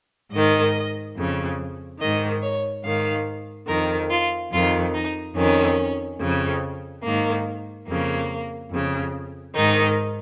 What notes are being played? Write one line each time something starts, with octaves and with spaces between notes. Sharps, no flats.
G#2 D#3 D#5
F2 C#3
G#2 D#3 D#5
C#5
G#2 D#3 F5
F2 D#3 A#4
F4
F2 D#3 F4
D#4
F2 D#3 C#4
F2 C#3
G#2 D#3 A#3
F2 C#3 A#3
F2 C#3
G#2 D#3 D#4